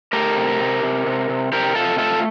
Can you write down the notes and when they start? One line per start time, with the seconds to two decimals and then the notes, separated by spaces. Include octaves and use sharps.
0.13 A3 G4 A#4
0.37 C3
0.60 C3
0.83 C3
1.06 C3
1.29 C3
1.52 C3 G4 A#4
1.75 C3 F4 A4
1.98 A3 F4 A4